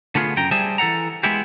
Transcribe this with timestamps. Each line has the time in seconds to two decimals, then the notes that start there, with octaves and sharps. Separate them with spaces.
0.15 D3 A3 B3 F4 G#4
0.37 F#2 C#3 G5 A#5
0.51 G3 G#4 C5 E5 G#5 A5
0.78 E3 A4 D#5 F#5 A#5
1.23 G#3 B3 E4 G4